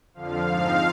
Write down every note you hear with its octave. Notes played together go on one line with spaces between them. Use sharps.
F2 D3 F3 F5
G#2 F3 C4 D#4